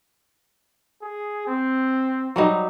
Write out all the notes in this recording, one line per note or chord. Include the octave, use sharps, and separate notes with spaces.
G#4
C4
F#3 G3 D#4